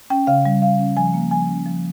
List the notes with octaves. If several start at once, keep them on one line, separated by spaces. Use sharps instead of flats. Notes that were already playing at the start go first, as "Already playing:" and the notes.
C#4 G5
C#3 F5
G3
C#3 F5
C#4
F3 G#5
A#3
F3 G#5
C#4
F3